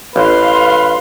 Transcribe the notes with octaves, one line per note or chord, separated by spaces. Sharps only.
A1 B4 F5 C6